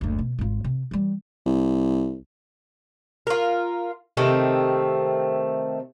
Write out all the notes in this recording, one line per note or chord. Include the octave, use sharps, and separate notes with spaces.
F#1 D2
B2
G#1 F4
C3
E3 G3
C2
F4 A#4
C3 D#3 A3 C4